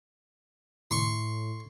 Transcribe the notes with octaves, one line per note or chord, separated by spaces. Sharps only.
A2 C6 C#6